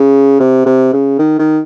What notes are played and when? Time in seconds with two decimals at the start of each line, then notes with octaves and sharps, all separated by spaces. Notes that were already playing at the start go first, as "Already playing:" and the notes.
Already playing: C#3
0.40 C3
0.66 C3
0.93 C#3
1.19 D#3
1.39 D#3